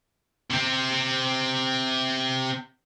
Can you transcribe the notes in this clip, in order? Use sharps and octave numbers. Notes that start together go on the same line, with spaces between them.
C3 C4